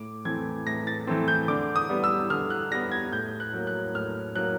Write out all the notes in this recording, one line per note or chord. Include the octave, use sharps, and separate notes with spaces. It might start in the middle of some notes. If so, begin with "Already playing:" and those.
Already playing: A2 D6
E3 A3 C4 G#6
A2 A#6
A6
E3 A3 C4
G6
D3 D6
D#6
G3 B3
E6
D3 F6
F#6
G3 B3 A#6
G#6
A2 G6
F#6
F#3 A#3
F#6
A2 F6
F#3 A#3 F#6